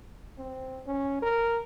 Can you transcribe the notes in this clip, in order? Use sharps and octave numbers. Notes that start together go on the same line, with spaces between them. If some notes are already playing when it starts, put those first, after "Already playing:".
C4
C#4
A#4